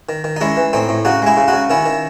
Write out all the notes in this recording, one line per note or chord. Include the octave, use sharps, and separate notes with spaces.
D#3
D#3
D#4
G#3 C#4 E4
E3
A2 C4 D#4
A2
C#3 D#4 F#4
G#3 E4 G#4
C#3
D#4 F#4
C#3
D#3 C#4 E4
D#3